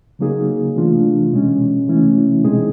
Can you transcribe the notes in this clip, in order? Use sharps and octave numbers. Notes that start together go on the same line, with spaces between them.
C#3 F#3 A#3 D#4 G#4
C3 E3 A3 D4 F4
B2 G#3 C#4
C3 E3 A3 C#4 E4
B2 G#3 C4 D#4 G#4